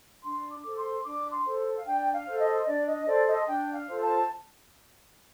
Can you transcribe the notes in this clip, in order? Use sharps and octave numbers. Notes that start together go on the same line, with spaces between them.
D4 C6
D6
A4 C5
C6
D4 D6
C6
A4 C5
F5
D4 G5
F5
A4 C5
D#5
D4 D5
D#5
A4 C5 D5
D#5
D4 G5
F5
F4 A4 C5
A5